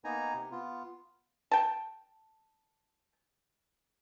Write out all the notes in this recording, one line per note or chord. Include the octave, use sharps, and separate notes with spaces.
A#3 B3 D#4 G#5 A#5
C3
B3 F4
G5 A5